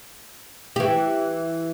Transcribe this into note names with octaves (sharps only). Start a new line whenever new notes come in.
E3 G4